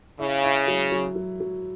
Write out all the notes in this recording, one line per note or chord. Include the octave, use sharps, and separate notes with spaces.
C#3 E4
E4
F#3
F#3
F#3
F#3